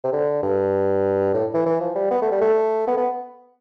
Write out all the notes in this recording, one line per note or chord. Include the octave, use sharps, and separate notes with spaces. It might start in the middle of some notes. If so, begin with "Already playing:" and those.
C3
D3
G2
A2
E3
E3
F3
G3
B3
A3
G3
A3
B3
B3